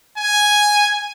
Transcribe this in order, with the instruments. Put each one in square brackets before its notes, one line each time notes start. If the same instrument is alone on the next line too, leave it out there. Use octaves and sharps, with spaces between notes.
[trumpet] G#5